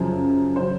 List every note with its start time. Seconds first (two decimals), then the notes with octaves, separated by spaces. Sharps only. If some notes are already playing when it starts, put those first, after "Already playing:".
Already playing: F#2 C#3 F3
0.56 C#3 F#3 C5